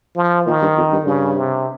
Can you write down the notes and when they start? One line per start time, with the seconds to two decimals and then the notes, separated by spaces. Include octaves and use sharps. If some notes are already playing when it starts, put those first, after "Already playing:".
0.16 F3
0.46 A#2 D#3
0.62 G2
0.77 F2
0.92 G2
1.06 G2 C#3
1.36 C3